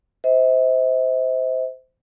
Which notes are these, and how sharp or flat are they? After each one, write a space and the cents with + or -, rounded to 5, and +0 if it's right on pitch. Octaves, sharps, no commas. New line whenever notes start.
C5 -15 E5 -45